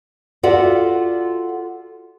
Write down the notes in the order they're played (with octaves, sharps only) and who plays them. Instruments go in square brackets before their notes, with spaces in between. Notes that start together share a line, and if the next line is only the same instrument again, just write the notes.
[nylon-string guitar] F4 F#4 A4 D5 E5 F#5